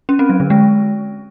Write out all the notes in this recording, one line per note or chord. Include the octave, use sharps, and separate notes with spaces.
C#4
C4
F#3
D3
G#3